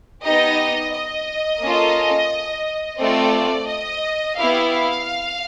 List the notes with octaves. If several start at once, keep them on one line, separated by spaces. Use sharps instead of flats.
B3 D#4 G4 D#5
D#5
A#3 C#4 F4 A4
A3 C4 F4 A4 D5
D#5
B3 E4 G4 F5
F5